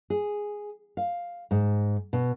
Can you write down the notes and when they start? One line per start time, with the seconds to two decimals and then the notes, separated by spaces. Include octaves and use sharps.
0.10 G#4
0.97 F5
1.51 G#2
2.13 B2